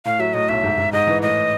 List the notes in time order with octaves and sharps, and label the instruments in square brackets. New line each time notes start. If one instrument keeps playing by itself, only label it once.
[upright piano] A2 [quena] F5
[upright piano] F#3 [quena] E5
[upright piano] A2 [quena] D#5
[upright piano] B1 [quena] E5
[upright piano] G#2
G#2
[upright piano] G#2 [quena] D#5
[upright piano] E3
[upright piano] A2 [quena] D#5